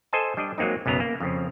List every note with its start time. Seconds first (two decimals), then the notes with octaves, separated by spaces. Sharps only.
0.13 A4 C5 D#5 G#5 A5
0.37 G3 D4 D#5
0.58 F#3 G#3 A#3 C4 D#4
0.86 B1 F#2 C#3 B3 A#5
1.00 A#3
1.20 F2 C#3 F3